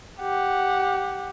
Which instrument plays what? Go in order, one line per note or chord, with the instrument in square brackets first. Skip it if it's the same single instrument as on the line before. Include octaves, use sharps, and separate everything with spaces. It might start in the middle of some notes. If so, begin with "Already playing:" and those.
[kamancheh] G4 F#5